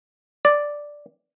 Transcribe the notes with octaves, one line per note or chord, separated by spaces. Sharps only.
D5